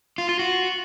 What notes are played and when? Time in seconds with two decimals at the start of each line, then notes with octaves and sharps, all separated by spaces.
0.18 F4
0.29 F4
0.39 F#4